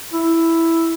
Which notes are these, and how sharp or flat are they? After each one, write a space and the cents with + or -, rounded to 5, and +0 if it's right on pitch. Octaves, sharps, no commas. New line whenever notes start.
E4 +0